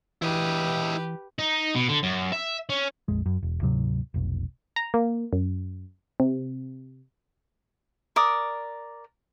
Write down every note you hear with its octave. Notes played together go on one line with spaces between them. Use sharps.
E3 E4 G4 B4 D#5
D#4
B2
D3
F#2
E5
C#4
A#1 F2 G#3
F#2
E1
D2 G#2 C3 F#3
F1 B1
A#5
A#3
F#2
C3
A#4 D5 D#6